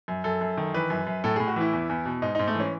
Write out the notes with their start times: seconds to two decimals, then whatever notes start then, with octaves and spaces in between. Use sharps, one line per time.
0.08 F#2
0.24 F#2 A4
0.41 F#2
0.57 D#3
0.74 E3 B4
0.90 F#2
1.07 F#2
1.24 A2 A4
1.36 A2 G#4
1.48 F#4
1.56 E3 E4
1.73 E2
1.89 E2
2.06 B2
2.22 G#2 D#4
2.35 G#2 D#4
2.48 A3
2.55 E3 C#4